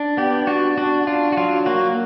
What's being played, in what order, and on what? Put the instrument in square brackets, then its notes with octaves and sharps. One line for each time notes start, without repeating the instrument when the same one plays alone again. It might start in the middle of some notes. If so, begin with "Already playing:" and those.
Already playing: [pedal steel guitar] D4
B3 G4
D4 F#4
D4 F#4
D4 F4
F#4
F#3 F4
A#3 F#4